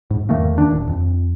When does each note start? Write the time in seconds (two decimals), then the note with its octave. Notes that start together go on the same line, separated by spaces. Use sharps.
0.11 G#2
0.29 E2 D#3 A3 A#3
0.58 D#3 D4
0.71 D#1
0.89 F2